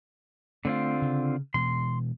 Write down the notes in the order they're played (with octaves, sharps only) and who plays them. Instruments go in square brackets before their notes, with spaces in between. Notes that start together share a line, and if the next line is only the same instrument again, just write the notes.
[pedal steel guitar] D3 C4 F4 [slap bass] A3
[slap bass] C#3
[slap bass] B2 E3 G#3 [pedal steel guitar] C6